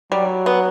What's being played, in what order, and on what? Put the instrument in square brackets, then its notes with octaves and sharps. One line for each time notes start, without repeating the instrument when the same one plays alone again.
[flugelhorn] F#3 [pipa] G3
[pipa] B3